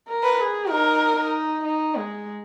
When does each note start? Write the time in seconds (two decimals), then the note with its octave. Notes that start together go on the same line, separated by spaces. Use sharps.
0.08 A#4
0.24 B4
0.40 G#4
0.70 D#4 A#4
1.17 D#4
1.64 D#4
1.96 G#3